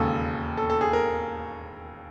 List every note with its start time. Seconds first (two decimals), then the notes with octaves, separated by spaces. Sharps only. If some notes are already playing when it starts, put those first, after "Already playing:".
Already playing: E1 D#2 C#3 A4
0.57 A4
0.70 A4
0.81 G#4
0.93 A#4